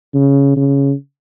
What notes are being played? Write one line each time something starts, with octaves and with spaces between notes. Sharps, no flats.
C#3
C#3